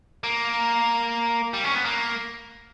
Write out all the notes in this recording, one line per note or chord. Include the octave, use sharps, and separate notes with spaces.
A#3
G3
C#4
B3
A#3